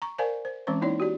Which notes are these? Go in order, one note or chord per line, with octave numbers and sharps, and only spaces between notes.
A#5 C#6
A#4 C5 D5 F5 G#5 A5
C5
E3 G#3 C4 C#4 C5 C#6
A#3 D#4 E4 C#5 D5
F#4 G4 D5